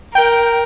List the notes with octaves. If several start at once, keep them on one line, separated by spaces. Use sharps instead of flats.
A#4 G5